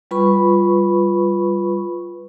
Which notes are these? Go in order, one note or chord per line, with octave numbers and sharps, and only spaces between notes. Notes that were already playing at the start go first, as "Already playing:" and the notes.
G3 F4 B4 B5 C#6